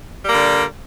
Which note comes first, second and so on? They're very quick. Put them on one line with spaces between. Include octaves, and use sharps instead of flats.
G3 A#3 D3